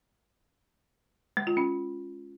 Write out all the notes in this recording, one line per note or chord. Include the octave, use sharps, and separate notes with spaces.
G#3
F4
C#4